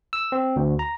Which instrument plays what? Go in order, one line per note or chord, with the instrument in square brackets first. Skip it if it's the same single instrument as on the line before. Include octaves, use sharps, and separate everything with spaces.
[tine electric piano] E6
C4
D2
A#5